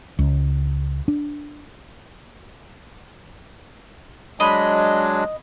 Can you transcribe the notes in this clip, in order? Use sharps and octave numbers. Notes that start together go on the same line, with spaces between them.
C#2
D4
F#3 G#3 D4 D#5 B5